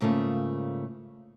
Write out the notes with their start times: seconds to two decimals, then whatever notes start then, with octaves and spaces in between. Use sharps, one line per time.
0.01 G#2 C#3 A3 A#3 F4